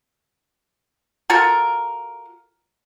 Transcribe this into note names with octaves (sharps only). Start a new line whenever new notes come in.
F4 F#4 A4 A#4